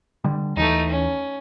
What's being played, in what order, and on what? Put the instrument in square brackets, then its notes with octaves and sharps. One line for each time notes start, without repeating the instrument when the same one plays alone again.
[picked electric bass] D3 G3
[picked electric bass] D#2 E3 [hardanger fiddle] A3 D#4
[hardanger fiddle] C#4